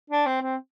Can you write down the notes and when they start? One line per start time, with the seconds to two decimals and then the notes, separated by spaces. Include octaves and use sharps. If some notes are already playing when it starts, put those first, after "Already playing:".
0.10 D4
0.26 C4
0.42 C4